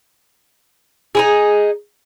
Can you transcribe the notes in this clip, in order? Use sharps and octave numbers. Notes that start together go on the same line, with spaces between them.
D#4 E4 G#4